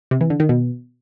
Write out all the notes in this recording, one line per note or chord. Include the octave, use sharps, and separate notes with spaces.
C3
E3
D3
D#3
B2